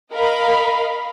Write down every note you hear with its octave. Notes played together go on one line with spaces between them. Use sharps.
A#4 D#5 F5 B5